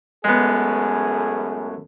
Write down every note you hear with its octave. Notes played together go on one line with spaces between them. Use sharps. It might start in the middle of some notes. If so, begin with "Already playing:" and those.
A1 F#2 G#3 A3 B3 G#4